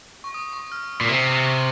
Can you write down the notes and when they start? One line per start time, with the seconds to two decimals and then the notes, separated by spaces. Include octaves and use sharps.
0.24 C#6
0.34 D#6
0.53 C#6
0.72 F6
1.01 A#2
1.09 C3
1.46 C#6